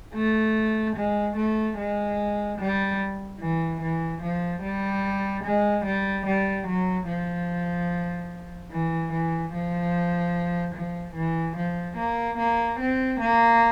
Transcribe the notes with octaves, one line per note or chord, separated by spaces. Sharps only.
A3
G#3
A3
G#3
G3
E3
E3
F3
G3
G#3
G3
G3
F#3
F3
E3
E3
F3
F3
E3
F3
A#3
A#3
C4
A#3